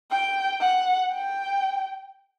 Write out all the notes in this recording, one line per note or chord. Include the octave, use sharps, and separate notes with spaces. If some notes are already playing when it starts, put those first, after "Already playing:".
G5
F#5
G5